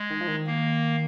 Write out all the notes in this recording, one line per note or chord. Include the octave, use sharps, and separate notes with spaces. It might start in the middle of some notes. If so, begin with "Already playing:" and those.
Already playing: G#3
D#3
F3
D#3
A#3